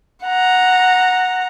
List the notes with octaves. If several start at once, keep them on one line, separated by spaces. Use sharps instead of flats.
F#5 A#5